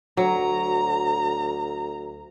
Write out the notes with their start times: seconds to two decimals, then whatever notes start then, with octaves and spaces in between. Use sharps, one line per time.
0.17 D2 F#3 A#5